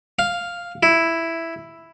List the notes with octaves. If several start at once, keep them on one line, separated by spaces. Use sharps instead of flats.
F5
E4